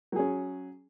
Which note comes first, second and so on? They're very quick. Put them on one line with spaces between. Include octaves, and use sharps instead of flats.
F#3 G#4 C#4